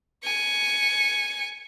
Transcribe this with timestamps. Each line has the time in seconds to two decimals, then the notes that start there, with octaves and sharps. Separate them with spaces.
0.24 G#5 C#7